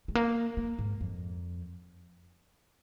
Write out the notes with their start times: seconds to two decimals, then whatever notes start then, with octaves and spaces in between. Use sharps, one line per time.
0.08 G#3
0.15 A#3
0.57 A#3
0.79 G#2
1.01 F2